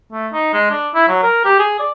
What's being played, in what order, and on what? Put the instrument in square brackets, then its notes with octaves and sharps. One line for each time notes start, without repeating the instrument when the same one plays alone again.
[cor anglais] A3
D#4
G#3
D4
E4
F#3
A#4
G4
G#4
D5